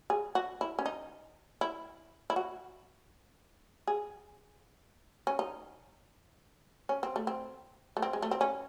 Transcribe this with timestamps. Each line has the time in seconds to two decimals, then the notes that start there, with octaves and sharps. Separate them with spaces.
0.10 G#4
0.35 F#4
0.61 E4
0.79 C#4
0.86 D#4
1.61 E4
2.30 E4
2.36 F#4
3.87 G#4
5.27 C#4
5.39 D#4
6.89 C#4
7.03 C4
7.16 A3
7.27 C4
7.97 A3
8.02 C4
8.13 G#3
8.22 A3
8.31 C4
8.41 C#4